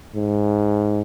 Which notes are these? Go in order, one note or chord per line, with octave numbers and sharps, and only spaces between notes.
G#2